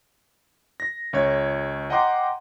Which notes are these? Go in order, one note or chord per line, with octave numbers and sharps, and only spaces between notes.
A#6
C#2 C#5 G#6
D#5 F#5 G5 A#5 C6 D6